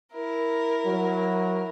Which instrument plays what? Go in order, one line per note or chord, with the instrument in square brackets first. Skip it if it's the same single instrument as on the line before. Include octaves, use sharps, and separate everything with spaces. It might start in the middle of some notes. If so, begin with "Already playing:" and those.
[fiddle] E4 A#4
[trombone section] F#3